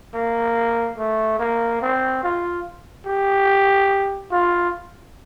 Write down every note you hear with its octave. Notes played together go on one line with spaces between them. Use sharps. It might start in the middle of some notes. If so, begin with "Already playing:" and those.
A#3
A3
A#3
C4
F4
G4
F4